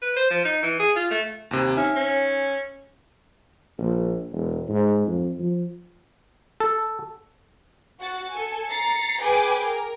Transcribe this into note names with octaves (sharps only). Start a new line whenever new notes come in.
B4
C5
F3
D#4
E3
G#4
F4
A3
D#2 C3
C#4 D#4 E5 G#5 F6
C#4
A#1
E1
G#2
F2
F3
A4
F#4 F#5 A6
A4 G#5
A#5 A6 C7 C#7
G#4 B4 G5 G#5 D6
A#4